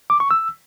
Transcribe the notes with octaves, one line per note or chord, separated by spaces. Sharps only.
D6
C#6
E6